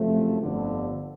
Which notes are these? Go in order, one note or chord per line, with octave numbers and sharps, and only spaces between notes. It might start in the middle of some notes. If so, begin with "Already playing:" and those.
Already playing: F#1 F2 C3 F3 A3
G1 F2 D3